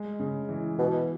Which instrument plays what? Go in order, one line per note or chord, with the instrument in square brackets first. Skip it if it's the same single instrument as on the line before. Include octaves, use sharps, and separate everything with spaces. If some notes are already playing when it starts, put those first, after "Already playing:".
Already playing: [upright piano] G#3
C#3
E3
[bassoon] B2 [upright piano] B3